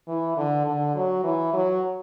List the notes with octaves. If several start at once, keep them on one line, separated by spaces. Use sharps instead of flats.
E3
D3
D3
F#3
E3
F#3